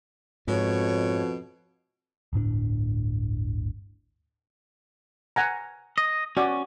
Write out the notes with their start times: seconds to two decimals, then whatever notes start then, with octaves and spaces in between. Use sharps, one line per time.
0.48 F2 G#2 B2 C#5
2.33 D1 G1 A2 D4
5.36 F#5 G#5 A#5
5.98 D#5
6.37 C#4 F#4 D5